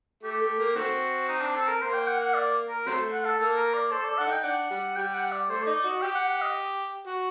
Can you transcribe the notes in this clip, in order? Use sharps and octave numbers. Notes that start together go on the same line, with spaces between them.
A3 G4
A3
A#3
D#3 A3 C4 F#4
D#4
D4
A4
A#4
A#3 C5
G5
F#5
F#5
D5
A#4
C3 F#3 A3 C5
F#5
A4
A#3 A4
A#4
D5
A4 C5
D5
A4
D4 F#5
D#4 G5
D4 F#5
G3
G3 G5
F#5
D5
A3 C5
D#4 D5
D5
F#4 D#5
G4 G5
F#5
F#5
D#5
F#4